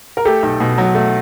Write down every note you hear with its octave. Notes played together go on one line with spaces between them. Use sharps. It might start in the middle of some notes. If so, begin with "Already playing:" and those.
A#4
A3 G4 A4
B1
B2
F#3
A3